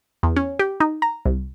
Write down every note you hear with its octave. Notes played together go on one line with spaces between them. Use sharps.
E2
C#4
G4
D#4
A#5
C2